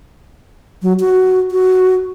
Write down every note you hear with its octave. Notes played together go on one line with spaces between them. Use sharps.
F#3
F#4
F#4